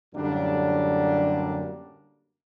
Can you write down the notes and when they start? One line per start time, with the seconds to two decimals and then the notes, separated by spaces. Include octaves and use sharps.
0.14 F#2 A2 D3 G3 A#3 D4